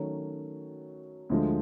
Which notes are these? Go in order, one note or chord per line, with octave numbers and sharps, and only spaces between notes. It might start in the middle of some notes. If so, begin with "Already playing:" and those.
Already playing: D#3 F#3 A3 C#4
D2 D3 F3 G#3